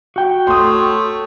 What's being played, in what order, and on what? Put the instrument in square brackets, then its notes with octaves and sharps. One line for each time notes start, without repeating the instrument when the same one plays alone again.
[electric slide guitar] F#4 G5
[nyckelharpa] A3 C#5 [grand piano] C6 D#6